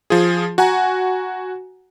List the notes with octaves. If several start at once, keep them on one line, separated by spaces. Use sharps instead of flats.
F3 F4 G#4
F#4 F#5 G#5 A#5